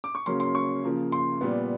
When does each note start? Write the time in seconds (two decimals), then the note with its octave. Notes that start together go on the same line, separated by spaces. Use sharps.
0.04 D6
0.15 C#6
0.26 C#3 F#3 A#3 C#4 C6
0.40 C6
0.55 C#6
0.84 C#3 F3 A#3
1.12 C6
1.41 A#2 G3 B3